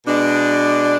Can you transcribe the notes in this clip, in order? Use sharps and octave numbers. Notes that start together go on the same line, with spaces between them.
B2 G#3 D4